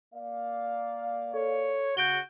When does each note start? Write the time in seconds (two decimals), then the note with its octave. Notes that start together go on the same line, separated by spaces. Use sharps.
0.14 A#3 D5 F5
1.34 A4 C#5
1.97 C#3 F#4 G6 D7 G7